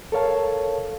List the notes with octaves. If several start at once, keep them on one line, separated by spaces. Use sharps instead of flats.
A4 A#4 C#5 F5 A5